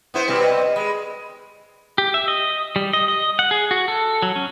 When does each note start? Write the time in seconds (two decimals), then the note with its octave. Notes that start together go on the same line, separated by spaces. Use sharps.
0.14 B3 E4 C5
0.28 B2 G3 C4 B4
0.42 D#5
0.76 G#3 B5
1.98 G4
2.14 E5
2.28 D#5
2.76 G3
2.93 D#5
3.08 D#5
3.39 F#5
3.51 G#4
3.71 F#4
3.88 A4
4.22 F#3
4.36 C#4